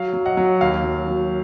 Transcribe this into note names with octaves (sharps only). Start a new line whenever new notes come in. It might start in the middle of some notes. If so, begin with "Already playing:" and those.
Already playing: F#3 F5
F#3
D#5 F#5
F#3
D#2 F5
F#3
F#3